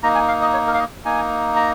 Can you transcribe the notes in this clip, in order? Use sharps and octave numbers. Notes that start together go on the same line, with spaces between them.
A#3 D#4 A#5
G#5
F5
D#5
C#5
A#4
F5
D#5
A#3 D#4 G#5
A#5